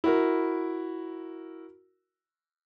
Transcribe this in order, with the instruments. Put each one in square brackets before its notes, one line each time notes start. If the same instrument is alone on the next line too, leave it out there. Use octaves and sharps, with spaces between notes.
[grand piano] E4 F#4 A#4